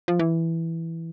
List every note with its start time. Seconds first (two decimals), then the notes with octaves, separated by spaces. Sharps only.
0.08 F3
0.19 E3